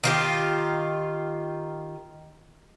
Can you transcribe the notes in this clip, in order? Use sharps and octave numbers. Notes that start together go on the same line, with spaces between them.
D#3 F4 G4